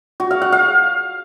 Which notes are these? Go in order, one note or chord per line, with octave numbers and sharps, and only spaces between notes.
F#4
F5
F#5
F5